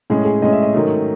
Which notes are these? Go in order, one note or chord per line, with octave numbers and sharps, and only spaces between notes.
A2 G#3 C#4 G#4
G#4
A2 G#3 C#4 D#5
E5
D#5
G#2 D#3 F#3 A3 C#4